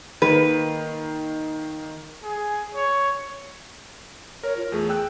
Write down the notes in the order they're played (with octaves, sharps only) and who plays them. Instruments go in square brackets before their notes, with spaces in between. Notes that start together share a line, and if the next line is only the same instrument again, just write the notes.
[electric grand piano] D#3 A#3 [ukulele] B4
[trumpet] G#4
C#5
[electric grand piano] A#4 [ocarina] C#5
[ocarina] F4
[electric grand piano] E2 A3 [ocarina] G#4
[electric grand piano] G5 E6 F#6